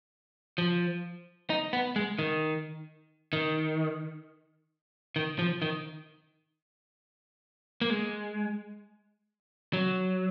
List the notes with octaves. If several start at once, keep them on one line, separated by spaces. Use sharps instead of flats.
F3
D#4
B3
G#3
D#3
D#3
D#3
F3
D#3
A#3
G#3
F#3